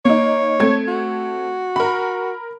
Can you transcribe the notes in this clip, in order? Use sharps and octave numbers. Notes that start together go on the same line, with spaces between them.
A#3 D#4 C#5
A3 C4 G#6
F#4
A#4 B5